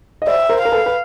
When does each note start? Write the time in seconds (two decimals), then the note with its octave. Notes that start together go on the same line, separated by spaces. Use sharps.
0.22 D#5
0.27 C5 D5 E5
0.49 A#4 C5
0.61 A#4 F5
0.72 A4 B4
0.86 B4